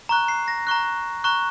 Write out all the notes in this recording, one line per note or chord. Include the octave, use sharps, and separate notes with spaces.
A#5 C#6 F#6
C7
A#6
A#5 C#6 F#6
A#5 C#6 F#6